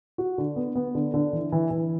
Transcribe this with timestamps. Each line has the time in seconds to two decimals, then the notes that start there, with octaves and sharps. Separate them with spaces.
0.18 F#4
0.38 D3
0.56 B3
0.75 B3
0.95 D3
1.14 D3
1.33 E3
1.52 E3
1.71 E3